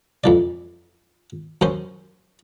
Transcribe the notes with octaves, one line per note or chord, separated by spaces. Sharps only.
F2 E3 D5
F#2 C#4 C5